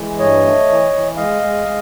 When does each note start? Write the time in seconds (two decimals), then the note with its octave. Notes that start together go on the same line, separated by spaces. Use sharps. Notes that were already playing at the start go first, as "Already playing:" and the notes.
Already playing: E3 G#3
0.18 G2 C#5 D#5
0.44 A3
0.68 E3
0.93 E3
1.16 G#3 D#5 F5
1.42 G#3
1.66 G#3